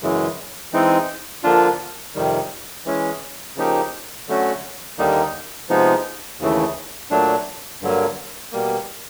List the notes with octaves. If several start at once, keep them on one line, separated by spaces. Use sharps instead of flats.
F#2 C#3 E3 G#3
E3 G#3 C4 D#4
D3 F3 A#3 D4 F4
F2 C3 D#3 G3
E3 G#3 C#4
C#3 F3 A#3 D#4 G4
D3 F#3 A3 C#4 F#4
D#2 D3 G3 A#3 D#4
C3 F3 G#3 B3 D#4
D#2 C#3 E3 A3
A#2 F#3 A3 D4
G2 D3 F#3 A#3
B2 G3 A#3